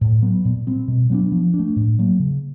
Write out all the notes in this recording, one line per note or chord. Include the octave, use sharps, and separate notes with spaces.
A2
F#3 B3
A#2
G3 C4
B2
F#3 B3 D4
F3
D4
A3
A2
F#3 A#3
C#3